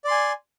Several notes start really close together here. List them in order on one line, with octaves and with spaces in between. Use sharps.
D5 C6 G#5